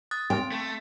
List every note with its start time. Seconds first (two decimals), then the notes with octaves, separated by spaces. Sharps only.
0.11 D#6 F#6 A6
0.30 C4 G5 C6
0.52 A3